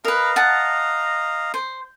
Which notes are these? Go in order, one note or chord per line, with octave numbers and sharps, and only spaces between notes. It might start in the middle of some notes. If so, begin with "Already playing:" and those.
A#4 B4 D#5 F5 A#5
F#5 A5
C5